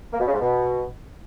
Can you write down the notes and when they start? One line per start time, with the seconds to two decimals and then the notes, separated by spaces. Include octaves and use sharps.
0.13 A#3
0.20 B2
0.27 C#3
0.33 G#2
0.40 B2